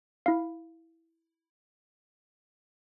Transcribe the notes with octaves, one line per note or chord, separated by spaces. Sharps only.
E4 F5